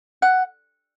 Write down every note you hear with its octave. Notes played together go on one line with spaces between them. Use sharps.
F#5